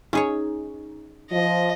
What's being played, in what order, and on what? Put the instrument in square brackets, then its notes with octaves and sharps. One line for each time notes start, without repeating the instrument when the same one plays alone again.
[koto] C#4 G#4 C#5 [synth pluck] D#4
[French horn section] F3 [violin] D#5